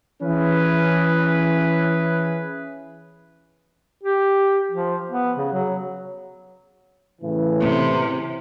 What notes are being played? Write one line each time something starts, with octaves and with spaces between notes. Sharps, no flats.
E3 C#4 E4 G#4 B4
G4
F3
B3
C#3
F#3
A2 C#3 E3
C3